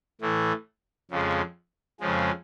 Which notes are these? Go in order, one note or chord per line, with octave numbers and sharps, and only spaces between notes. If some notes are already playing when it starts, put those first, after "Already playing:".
A2 E3 A3
F2 C#3 F3 G#3
F2 C#3 F3 G#3